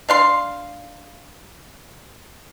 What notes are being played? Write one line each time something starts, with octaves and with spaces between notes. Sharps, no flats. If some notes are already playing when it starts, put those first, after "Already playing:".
D4 F5 C6